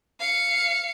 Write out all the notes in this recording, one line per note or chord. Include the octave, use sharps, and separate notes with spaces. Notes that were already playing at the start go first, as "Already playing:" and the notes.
F5 C#7